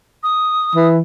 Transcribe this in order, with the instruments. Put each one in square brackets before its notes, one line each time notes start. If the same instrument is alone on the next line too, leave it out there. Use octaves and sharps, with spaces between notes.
[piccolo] D#6
[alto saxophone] E3